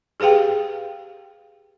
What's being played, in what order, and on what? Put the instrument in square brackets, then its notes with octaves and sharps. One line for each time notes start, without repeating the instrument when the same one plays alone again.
[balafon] G4 G#4 B4 F5 G5